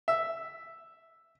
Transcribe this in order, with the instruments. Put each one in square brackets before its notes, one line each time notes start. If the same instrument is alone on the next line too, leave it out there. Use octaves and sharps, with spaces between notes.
[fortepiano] E5